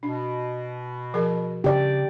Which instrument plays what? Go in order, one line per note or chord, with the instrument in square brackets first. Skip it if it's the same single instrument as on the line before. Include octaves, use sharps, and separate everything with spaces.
[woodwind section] B2 [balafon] D4
[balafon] F3 G#4 A#4
[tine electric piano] C#3 [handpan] G4 D5